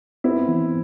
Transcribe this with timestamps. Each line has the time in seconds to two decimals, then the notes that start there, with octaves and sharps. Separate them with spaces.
0.24 B3 C4 E4
0.48 E3